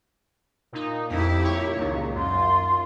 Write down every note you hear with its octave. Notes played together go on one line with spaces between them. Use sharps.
A#2 D#4
F2 E4 G4
A#2 C#5
C#2 A#2 D#3 A#5
F#2 F4 C6